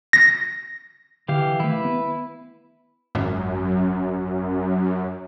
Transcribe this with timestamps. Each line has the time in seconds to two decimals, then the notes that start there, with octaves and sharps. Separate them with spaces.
0.13 A#6
1.28 D3 E3 G4 F5
1.60 D#3 A3 E4 B4
1.85 B3
3.15 G#1 F#2